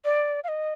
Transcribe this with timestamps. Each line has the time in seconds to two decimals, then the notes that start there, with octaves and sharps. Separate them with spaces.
0.05 D5
0.44 F5
0.48 D#5